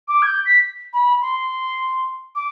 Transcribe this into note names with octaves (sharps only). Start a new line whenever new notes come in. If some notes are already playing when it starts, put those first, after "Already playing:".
D6
G#6
G6
B6
B5
C6
D6